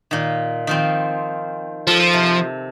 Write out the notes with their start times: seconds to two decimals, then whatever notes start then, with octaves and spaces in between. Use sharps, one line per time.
0.11 A#2 D#3
0.67 D#3 F3 C4
1.87 F3 A4
2.13 C3